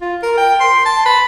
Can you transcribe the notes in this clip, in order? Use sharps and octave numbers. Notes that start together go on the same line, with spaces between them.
F4
A#4
G5
C6
A5
B5